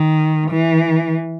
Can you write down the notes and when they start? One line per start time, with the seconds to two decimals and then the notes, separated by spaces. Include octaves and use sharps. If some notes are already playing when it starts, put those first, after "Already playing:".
Already playing: D#3
0.51 E3